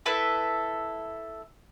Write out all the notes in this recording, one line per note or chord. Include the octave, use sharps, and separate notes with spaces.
E4 A4 B4 E5